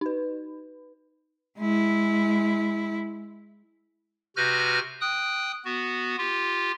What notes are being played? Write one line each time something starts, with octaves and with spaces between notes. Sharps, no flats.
D#4 B4
G#3 E4
C3 F#4 B4 F6 G6 A#6
G5 D#6 F#6
B3 F#4
F4 G4